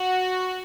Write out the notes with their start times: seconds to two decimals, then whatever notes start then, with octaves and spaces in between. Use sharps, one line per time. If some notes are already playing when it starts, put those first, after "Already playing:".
Already playing: F#4